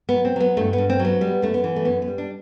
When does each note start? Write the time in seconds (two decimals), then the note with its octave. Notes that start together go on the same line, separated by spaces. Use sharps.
0.09 F#3 B3
0.25 C4
0.36 F#3 B3
0.57 G2 A3
0.73 B3
0.78 G2
0.90 C4
0.99 F#3
1.05 B3
1.21 G3 B3
1.42 F#2 A3
1.54 B3
1.64 E3
1.76 A3
1.85 F#2 B3
2.02 B3
2.08 G3
2.18 D4